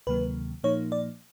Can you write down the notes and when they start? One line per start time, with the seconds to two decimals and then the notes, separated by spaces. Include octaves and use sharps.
0.07 D2 C3 D#3 F#3 A#3 B4
0.63 A#2 F3 A#3 D#4 C#5
0.92 D5